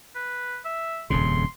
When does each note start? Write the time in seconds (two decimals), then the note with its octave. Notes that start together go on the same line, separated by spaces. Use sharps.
0.15 B4
0.65 E5
1.10 D#1 F2 C#3 C6